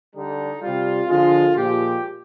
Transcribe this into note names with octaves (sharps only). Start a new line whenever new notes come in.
D3 G3 D#4
C3 G3 F4
D3 F3 G#3 F4
A#2 F3 G#3 G4